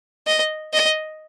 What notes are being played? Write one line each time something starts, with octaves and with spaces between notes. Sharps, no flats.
D#5
D#5